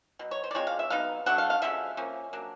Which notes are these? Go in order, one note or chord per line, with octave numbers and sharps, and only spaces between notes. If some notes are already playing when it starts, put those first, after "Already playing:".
B2 F#3
C#5
C5
D5
F3 G#3 C4 C#5
F5
E5
F#3 B3 D#4 F5
D3 F#3 A3 D4 F#5
F5
F5
D3 F3 G#3 C#4 E5
F3 A#3 C#4
F#3 A#3 D4